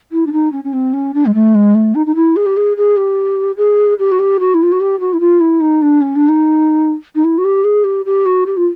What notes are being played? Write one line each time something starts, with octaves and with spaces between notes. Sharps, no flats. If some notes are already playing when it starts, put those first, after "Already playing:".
E4
D4
D#4
C#4
C#4
C4
C#4
D4
G#3
A3
G#3
A3
D#4
D#4
E4
G#4
G4
G#4
G#4
G4
G#4
G4
F#4
G4
F#4
E4
F4
F#4
G4
F#4
E4
F4
E4
D#4
D4
C#4
D4
D#4
D#4
E4
F#4
G4
G#4
G4
G4
F#4
G4
F4